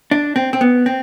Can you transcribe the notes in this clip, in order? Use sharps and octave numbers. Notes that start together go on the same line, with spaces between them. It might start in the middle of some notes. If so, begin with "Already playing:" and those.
D4
C4
C4
B3
C4